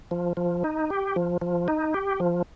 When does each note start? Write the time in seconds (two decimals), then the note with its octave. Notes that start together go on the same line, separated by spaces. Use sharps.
0.11 F3
0.37 F3
0.64 D#4
0.90 G4
1.16 F3
1.41 F3
1.68 D#4
1.94 G4
2.20 F3